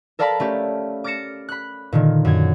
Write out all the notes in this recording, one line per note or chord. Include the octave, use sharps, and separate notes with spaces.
A4 A#4 D5 F5 A5 B5
A3 C#4 G4
D6 F6 A6 A#6 C#7 E7
B5 F#6
A#2 D3 D#3
F#2 G#6